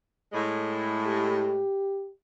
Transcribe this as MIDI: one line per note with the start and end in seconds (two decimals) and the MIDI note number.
0.33 1.63 45
0.33 1.63 56
1.06 2.11 67